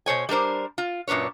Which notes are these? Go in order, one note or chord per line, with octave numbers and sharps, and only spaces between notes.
B2 C5 C#5 G#5
G3 D4 A#4 C5
F4
F#2 A#2 D4 B4 C#5